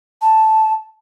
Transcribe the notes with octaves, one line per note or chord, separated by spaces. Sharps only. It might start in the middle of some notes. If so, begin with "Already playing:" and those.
A5